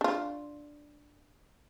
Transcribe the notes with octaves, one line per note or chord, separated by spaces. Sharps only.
D4 F4